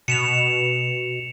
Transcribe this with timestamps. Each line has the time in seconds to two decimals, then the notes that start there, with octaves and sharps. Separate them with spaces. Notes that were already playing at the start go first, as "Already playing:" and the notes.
0.08 B2 C#7 E7 F7